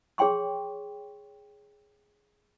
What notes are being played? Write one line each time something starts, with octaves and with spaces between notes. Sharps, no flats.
G#4 C#5 G5 C6 C#6